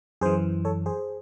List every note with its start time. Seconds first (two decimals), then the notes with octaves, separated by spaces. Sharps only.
0.21 F#2 E3 G#4 C5
0.65 A4 C#5
0.86 G#4 C5